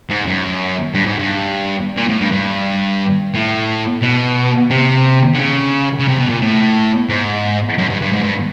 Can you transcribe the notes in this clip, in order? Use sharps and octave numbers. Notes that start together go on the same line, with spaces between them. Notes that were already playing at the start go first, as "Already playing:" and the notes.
G#2
F#2
G2
G#2
G2
A#2
A2
G2
G2
A2
B2
C3
D3
C#3
C#3
C3
B2
A#2
A2
G#2
F#2
G2
G2
G#2
G2